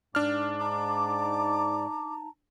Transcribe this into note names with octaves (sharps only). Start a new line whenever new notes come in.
G#2 D4 D5 F6
D#4 A5 A#5 D6